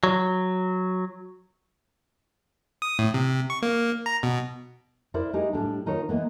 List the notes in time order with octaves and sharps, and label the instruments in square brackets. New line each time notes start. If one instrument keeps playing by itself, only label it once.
[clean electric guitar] F#3
[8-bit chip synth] D#6
A2
C3
C#6
A#3
A#5
B2
[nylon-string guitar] E4 A#4 C5 D5 E5
G#3 D#4 G4 G#4
A2 G3 G#3 D4
D#3 D#4 F4 A#4 C#5
E3 G#3 A#3 B3